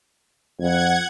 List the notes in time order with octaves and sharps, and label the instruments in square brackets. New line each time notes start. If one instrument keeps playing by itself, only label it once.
[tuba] F2 [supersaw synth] F#5 G#6